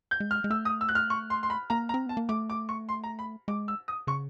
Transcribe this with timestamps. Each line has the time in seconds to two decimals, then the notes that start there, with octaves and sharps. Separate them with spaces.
0.11 G6
0.20 G#3
0.31 F6
0.44 G#3
0.50 A3 E6
0.65 D#6
0.81 E6
0.89 F#6
0.95 F6
1.10 C#6
1.30 C6
1.43 C6
1.50 B5
1.70 A#3 A#5
1.89 A#5
1.94 C4
2.06 B3 A5
2.17 A#3
2.29 A3 D6
2.50 D6
2.69 C#6
2.89 C6
3.04 A#5
3.19 B5
3.48 G#3 D6
3.68 E6
3.88 D#6
4.07 C#3 C#6